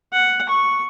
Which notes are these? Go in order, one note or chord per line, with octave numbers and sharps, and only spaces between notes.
F#5
C#6